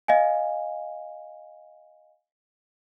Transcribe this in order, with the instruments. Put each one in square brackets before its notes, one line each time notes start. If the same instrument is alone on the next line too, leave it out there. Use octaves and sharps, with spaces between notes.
[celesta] D#5 F5 G#5